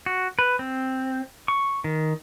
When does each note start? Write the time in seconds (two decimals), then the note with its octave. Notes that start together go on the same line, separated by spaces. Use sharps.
0.06 F#4
0.39 B4
0.59 C4
1.48 C#6
1.84 D#3